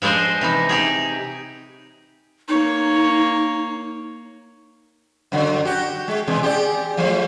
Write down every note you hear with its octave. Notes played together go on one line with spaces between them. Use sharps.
F3 G#3 D4 C5 D#5
C3 E3 D#4
D#4 G4 G#4
A#3 D#4 C#5
F#2 D3 F#3
F#4 G4
G#3
B2 E3 G#3
G4 G#4 D5
F3 F#3 A3